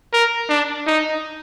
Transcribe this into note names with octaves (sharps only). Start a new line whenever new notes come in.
A#4
D4
D#4